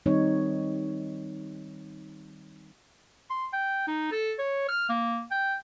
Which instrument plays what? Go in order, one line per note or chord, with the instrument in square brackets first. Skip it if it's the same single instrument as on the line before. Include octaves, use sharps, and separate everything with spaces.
[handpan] D#3 G3 C4 D#4 C#5
[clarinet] C6
G5
D#4
A4
C#5
F6
A#3
G5